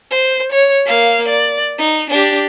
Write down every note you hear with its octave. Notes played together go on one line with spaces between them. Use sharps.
C5
C#5
A#3 F5
D5
D#4
D4 G4